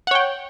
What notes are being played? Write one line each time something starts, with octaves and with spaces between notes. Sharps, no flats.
C#5 F#5 G5